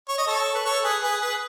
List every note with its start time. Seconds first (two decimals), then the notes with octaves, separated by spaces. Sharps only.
0.09 C#5
0.18 D#5
0.27 A4 C#5
0.55 B4
0.65 A4 C#5
0.84 G#4 B4
1.03 G#4 B4
1.21 G#4 B4